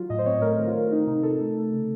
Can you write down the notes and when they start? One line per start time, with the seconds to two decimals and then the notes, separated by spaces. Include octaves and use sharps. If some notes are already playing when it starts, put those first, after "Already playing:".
Already playing: F#3 F4
0.10 A2 D#5
0.18 C5
0.26 C4 C#5
0.42 A3 A#4
0.59 D#3
0.67 F4
0.74 A3
0.91 C4 D#4
1.07 C3 D#4
1.23 C3 A4
1.40 A3
1.57 A3
1.72 C#3